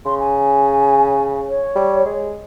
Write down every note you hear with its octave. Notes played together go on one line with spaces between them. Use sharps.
C#3 C6
G#5
C#5
G3
G#3